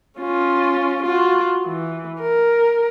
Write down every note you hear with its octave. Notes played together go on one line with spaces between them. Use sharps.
C#4 F4
F4 F#4
E3
A#4